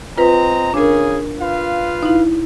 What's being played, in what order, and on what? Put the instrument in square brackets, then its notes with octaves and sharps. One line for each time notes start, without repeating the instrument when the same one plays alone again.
[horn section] C4 D#5 A#5 [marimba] F4 B4
[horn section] C#3 G#4 [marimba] D4 A#4
[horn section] F4 B4 F5
[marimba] D#4 E4